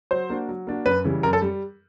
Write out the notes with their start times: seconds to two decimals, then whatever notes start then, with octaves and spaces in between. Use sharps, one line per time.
0.11 F#3 C5
0.30 A#3 D4 F#4
0.49 F#3
0.67 A#3 D4 F#4
0.86 F#2 B4
1.04 C#3 E3 G3
1.23 F#2 A#4
1.33 A4
1.42 G3